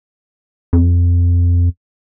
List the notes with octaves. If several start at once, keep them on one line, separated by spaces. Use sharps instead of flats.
F2